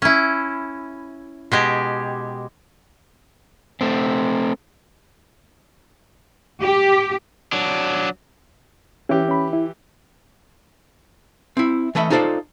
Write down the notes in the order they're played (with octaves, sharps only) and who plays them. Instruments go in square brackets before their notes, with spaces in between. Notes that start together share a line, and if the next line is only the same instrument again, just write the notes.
[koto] C#4 E4
B2 G#3 G4
[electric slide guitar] A3 C4
[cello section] G4
[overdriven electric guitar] F#3 D4
[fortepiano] E3 G4 [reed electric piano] C#4
[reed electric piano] C#4 B5
E4
[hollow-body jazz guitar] C4 E4
E3 A3 D#5 E5 B5
D#4 F4 A4 A#4 C5 D5